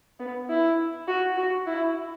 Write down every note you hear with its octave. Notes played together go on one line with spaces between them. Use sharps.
B3
E4
F#4
F#4
E4